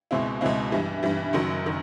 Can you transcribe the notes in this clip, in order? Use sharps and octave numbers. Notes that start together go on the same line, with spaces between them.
C#2 B2 G#3 C4 E4
C#2 B2 G#3 C4 E4
G2 E3 G3
G2 E3 G3
F#1 F#2 D#3 F#3
D#3